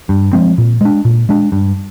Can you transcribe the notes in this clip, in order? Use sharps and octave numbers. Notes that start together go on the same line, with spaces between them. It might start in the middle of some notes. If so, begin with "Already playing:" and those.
G2
F3 G#3 C4
A#2
G#3 D4
A#2
G#3 D4
G2